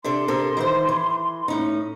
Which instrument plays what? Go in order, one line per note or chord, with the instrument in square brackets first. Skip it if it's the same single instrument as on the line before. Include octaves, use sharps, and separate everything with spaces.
[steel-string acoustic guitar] C3 D4 A4 [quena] C6
[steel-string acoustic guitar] C3 A4 A#4
D#3 E3 C5
E3
A2 C#4 D#4